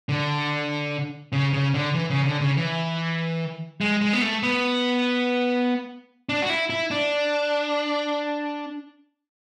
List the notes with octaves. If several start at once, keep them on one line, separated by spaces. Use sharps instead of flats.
D3
C#3
C#3
D3
E3
C#3
D3
C#3
E3
G#3
G#3
B3
A3
B3
D4
F#4
E4
E4
D4